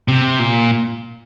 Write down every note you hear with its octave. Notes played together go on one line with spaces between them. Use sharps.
C3
A#2